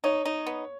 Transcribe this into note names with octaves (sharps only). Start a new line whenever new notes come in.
D#4 C#5
D#4
B3